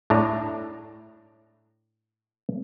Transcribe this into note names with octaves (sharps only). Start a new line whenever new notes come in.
A2 D4 A#5